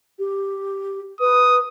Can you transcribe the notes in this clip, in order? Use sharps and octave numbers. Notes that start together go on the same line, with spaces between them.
G4
B4 D#6